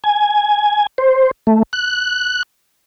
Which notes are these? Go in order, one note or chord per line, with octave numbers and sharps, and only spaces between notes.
G#5
C5
A3
F#6